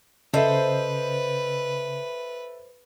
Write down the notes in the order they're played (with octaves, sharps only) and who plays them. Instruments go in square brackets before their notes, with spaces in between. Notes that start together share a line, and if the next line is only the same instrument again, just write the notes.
[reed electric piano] C#3 [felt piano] A4 E5 [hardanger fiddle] B4 [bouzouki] C5 D#5